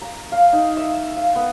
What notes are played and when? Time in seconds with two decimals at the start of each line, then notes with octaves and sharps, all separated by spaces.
0.02 A#5
0.32 F5
0.53 D#4
0.77 E5
1.17 F5
1.35 B3